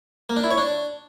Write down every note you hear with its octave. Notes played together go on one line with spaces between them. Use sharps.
A#3
D4
E4
C#5
D4